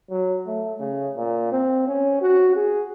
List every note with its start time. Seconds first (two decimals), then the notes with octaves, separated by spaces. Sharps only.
0.10 F#3
0.47 A3
0.80 C#3
1.16 A#2
1.52 C4
1.88 C#4
2.22 F#4
2.56 G#4